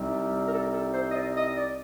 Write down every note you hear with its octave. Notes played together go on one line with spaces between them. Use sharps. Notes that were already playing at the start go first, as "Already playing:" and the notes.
Already playing: C2 C3 G3 C4 D#4
A#4
A4
A4
C5
D#5
D5
D#5
D5